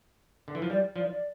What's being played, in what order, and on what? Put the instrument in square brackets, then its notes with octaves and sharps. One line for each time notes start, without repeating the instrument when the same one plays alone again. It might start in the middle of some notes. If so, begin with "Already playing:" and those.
[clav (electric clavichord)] D3
E3
F3
[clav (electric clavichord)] G3 [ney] D5
[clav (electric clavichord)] F3 [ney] D5
[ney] D5